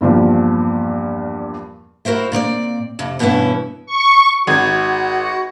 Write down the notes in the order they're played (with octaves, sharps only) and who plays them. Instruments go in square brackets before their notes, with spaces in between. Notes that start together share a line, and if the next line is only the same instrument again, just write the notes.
[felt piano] E2 G2 A#2 F3
[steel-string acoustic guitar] E4 F#4 A#4 C5 E5
A#2 C4 C#5 D5
F2 C3
G2 B2 E3 B3 C#4 E4
[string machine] C#6
[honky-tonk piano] G#1 G#6 [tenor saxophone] F#4